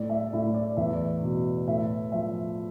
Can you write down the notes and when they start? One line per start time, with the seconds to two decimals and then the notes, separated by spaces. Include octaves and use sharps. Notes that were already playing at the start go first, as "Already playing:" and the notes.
Already playing: A2 D5
0.10 E5
0.33 A2 E5
0.54 D5
0.77 E2 E5
1.22 B2
1.67 A2 E5
2.12 F3 E5